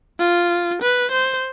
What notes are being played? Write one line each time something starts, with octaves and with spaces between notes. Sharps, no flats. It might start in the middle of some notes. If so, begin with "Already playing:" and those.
F4
B4
C5